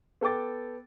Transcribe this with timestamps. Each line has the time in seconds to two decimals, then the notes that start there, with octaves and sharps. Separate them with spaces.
0.21 B3 A4 G5 D6 A6